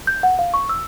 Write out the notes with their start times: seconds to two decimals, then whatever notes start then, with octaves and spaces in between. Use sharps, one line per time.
0.07 G6
0.23 F#5
0.39 F5
0.54 C#6
0.69 E6